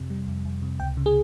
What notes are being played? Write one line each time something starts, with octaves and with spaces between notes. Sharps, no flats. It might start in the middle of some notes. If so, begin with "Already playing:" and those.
Already playing: F2 C3
G3
F2
F2
C3
C#2 G5
C#3
G#4